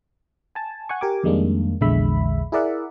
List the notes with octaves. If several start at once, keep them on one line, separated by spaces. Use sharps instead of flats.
G#5 A5
F#5 G#5 C#6
G4 A#4 G#5 D6
F2 D#3 G3 G#3 A#3 D4
A#1 E2 D3 G#3 E5 B5
E4 G#4 A#4 D5 E5 F#5